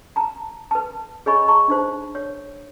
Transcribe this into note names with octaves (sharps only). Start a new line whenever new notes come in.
A5 A#5
B4 A5
G#4 C#5 D#5 G#5 B5 C#6
G#4 A5 A#5 C#6
D4 D#4 C5
C#5